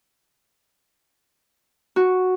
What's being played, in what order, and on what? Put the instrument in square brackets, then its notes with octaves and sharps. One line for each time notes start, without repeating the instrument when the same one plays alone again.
[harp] F#4